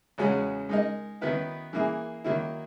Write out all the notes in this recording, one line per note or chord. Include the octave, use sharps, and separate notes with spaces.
E2 C#3 G#3 C#4 F#4
G#3 D#4 A#4 D#5
D#3 F#3 B3 E4 B4
E3 A#3 E4 G#4
D#3 F#3 A#3 E4